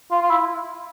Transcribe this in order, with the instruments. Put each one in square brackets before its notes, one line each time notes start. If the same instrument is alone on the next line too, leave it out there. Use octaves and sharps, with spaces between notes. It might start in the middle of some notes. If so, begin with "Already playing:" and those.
[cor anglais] F4
F4
E4